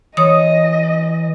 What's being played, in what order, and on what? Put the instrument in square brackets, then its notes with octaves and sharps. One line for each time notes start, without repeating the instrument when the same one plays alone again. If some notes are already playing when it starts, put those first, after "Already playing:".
[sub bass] E3 [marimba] C#5 D#6 [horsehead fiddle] D#5